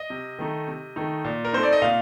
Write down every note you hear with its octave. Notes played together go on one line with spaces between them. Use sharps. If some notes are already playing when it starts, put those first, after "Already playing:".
Already playing: D#5
C3
D#3 A3 D#4
C3
D#3 A3 D#4
A#2
A#4
A3 C4 D#4 C5
D5
D#5
A#2 F5